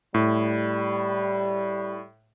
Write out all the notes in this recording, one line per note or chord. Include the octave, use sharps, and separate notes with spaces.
A2 G3